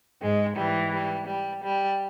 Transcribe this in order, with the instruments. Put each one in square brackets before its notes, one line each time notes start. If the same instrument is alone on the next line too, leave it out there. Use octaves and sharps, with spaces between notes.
[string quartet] G#2 G#3
G#2 E3 G3
G3
G3
G3